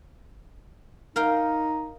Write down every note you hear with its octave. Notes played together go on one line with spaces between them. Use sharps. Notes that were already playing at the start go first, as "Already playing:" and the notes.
D#4 A#4 F5 G5